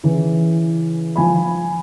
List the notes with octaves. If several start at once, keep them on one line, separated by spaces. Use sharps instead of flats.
C#3 E3
F3 G#5 B5